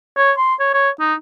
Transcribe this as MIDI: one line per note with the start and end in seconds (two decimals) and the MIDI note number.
0.17 0.32 73
0.37 0.55 84
0.60 0.70 73
0.74 0.90 73
1.00 1.14 63